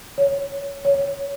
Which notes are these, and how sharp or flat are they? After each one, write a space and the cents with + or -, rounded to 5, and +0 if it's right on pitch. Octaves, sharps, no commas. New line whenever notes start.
C#5 +10
C#5 +10